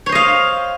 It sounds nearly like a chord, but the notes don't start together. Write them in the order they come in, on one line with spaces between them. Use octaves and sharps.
C#5 C5 D#5 F5